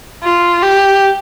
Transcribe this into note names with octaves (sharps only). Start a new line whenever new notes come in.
F4
G4